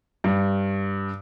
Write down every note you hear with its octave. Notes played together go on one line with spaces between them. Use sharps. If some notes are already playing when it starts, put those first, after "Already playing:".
G2